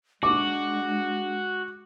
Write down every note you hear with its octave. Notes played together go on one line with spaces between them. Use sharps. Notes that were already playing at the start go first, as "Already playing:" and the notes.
G#3 D4 F#4 D6